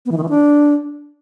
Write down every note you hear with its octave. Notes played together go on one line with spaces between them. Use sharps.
B3
E3
D#3
E3
D4